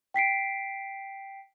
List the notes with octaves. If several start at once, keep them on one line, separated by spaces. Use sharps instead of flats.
G5 B6 C7 D7